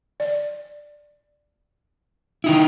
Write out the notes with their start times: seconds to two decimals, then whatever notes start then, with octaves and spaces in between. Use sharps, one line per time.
0.20 D5
2.44 D#3 D#4 E4